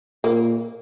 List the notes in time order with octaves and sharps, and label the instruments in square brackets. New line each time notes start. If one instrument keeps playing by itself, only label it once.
[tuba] A#2 [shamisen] A#3